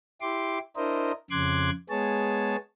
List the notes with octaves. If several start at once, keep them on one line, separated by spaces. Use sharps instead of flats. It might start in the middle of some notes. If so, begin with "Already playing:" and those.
E4 G4 C6 D6
D4 E4 A#4 C5 D#5
F2 C#3 C6 D6 F#6 G#6
G#3 B3 G#4 C#5 A5